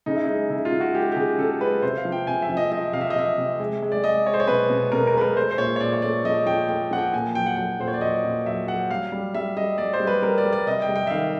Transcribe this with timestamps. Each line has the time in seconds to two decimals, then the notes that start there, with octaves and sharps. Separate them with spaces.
0.06 C#3 D#4
0.16 E4
0.26 G#3 D#4
0.50 C#3 E4
0.65 F4
0.72 C#3
0.80 F#4
0.95 G#3 G4
1.12 G4
1.16 C#3 G#4
1.38 C#3 A4
1.60 G#3 B4
1.82 C3 C5
1.97 F5
2.05 F3
2.12 G5
2.27 C3 G#5
2.42 E5
2.49 F3
2.57 D#5
2.72 F3 D#5
2.93 C3 F5
3.01 E5
3.10 D#5
3.16 C3 E5
3.38 C3
3.59 G#3
3.82 G#3
3.92 D5
4.04 G#3 D#5
4.26 G#3 C#5
4.34 C5
4.40 C#5
4.47 B2 B4
4.70 B2
4.92 B2 A#4
5.07 A#4
5.15 G#3 B4
5.21 A#4
5.37 A3 C5
5.51 C5
5.58 A#2 C#5
5.76 C#5
5.80 A#2 D5
5.93 C#5
6.02 A3 D5
6.24 F3 D#5
6.46 F3 G5
6.69 A3 G5
6.91 F3 F#5
6.98 G5
7.13 A#2 G#5
7.35 F#3 G5
7.46 F#5
7.56 F#3 G5
7.79 A#2 C5
7.88 C#5
7.94 D5
8.01 F#3 D#5
8.24 A#2
8.46 F#3 E5
8.67 F#3 F#5
8.90 G3 F5
9.12 G3
9.34 G3 E5
9.57 G3 D#5
9.78 G3 D5
9.93 C5
10.00 G3
10.07 B4
10.22 G3 A#4
10.38 D5
10.45 G3
10.53 D5
10.67 C3 D#5
10.82 G5
10.89 G3
10.96 G5
11.07 E5
11.10 D#3 F5